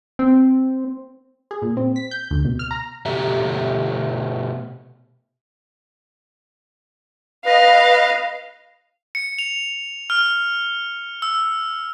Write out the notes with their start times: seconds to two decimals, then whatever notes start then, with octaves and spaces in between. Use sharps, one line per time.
0.19 C4
1.51 G#4
1.62 A#2
1.77 C4
1.96 B6
2.11 G6
2.31 D2
2.45 B2
2.59 F6
2.71 A#5
3.05 B2 A3 G4 E5 A#5
7.46 B4 D#5 F5
9.15 C#7
9.39 F7
10.10 F6
11.22 E6